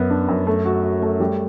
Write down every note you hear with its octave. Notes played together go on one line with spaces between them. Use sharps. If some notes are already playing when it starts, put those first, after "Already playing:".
Already playing: F#2 B3
D4
F#2
A3
F#4
F#4
A3
G3